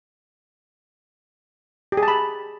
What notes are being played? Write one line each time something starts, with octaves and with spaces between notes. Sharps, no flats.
G4
G#4
A5
B5